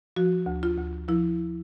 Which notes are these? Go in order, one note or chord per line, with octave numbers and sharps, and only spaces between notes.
F3 F#4
D2
F4
D2
F3 E4